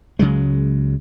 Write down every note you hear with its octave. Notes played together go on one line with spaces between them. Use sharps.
C#2 C#3 F#3 G#3